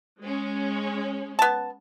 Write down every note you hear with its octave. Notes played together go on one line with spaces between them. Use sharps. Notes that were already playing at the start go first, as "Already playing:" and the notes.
G#3 C#4
B3 A5